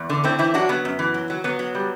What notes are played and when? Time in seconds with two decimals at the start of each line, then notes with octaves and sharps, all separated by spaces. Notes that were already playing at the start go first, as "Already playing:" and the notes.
Already playing: E2
0.10 D3
0.24 A2 C4 E4
0.39 E3 C4 E4
0.54 F#3 D4 F#4
0.69 F#3 B3
0.85 F#2
0.99 E3
1.14 F#3
1.30 F#3
1.44 F#3 B3
1.59 F#3
1.75 G3